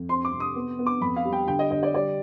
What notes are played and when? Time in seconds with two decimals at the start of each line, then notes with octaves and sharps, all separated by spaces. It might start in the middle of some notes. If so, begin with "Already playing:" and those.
Already playing: F2
0.09 C4 C6
0.25 D6
0.32 C3
0.40 D#6
0.56 B3
0.79 B3
0.86 D6
1.01 F2 B5
1.16 F5
1.25 G3
1.33 G5
1.47 D3 G5
1.59 D#5
1.71 D3 D#5
1.83 D5
1.94 G3 D5